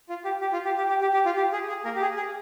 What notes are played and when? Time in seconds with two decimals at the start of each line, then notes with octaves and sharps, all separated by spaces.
0.09 F4
0.25 G4
0.41 G4
0.53 F4
0.65 G4
0.77 G4
0.89 G4
1.01 G4
1.13 G4
1.26 F4
1.36 G4
1.53 G#4
1.69 G#4
1.85 A#3 A#4
1.95 G4
2.01 G#4
2.17 G#4